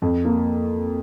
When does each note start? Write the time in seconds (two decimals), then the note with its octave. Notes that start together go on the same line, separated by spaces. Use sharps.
0.02 F2
0.25 A#3